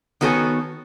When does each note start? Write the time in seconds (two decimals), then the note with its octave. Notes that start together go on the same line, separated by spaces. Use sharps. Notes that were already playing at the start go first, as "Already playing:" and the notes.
0.21 D#3 B3 F#4 A4 C#5 G#5